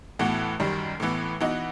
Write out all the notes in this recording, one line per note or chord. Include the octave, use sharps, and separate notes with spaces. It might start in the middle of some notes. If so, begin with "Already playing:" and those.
A2 E3 B3 F#4
F#2 D#3 G3
A2 E3 B3
E3 B3 D#4 F#4